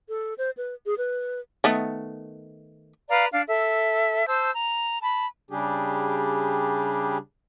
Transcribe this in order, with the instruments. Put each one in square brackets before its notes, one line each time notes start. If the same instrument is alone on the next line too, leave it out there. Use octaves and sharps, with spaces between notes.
[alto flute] A4
C5
B4
G#4
B4
[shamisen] D#3 A3 B3
[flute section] B4 D5 F5 A#5
D4 F5
A4 E5
C5 A5 E6 G6
A#5
A5 B5
[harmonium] C#3 G3 D4 G4 G#4